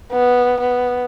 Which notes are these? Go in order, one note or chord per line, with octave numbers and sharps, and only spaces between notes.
B3
B3